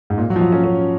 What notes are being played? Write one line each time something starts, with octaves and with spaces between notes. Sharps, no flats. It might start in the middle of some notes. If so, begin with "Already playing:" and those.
G#2
A#2
F#3
F3
F#3
C#4
C#4